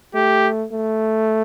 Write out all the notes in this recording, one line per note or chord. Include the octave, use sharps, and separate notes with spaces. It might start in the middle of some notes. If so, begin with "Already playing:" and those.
A3 G4
A3